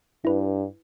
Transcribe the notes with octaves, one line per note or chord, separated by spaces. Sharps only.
G2 E4 B4